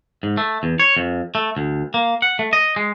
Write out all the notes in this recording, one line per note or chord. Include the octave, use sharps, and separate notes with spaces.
G#2
A3
E2
C#5
F2
A3
D2
A#3
F#5
A3
D#5
G#3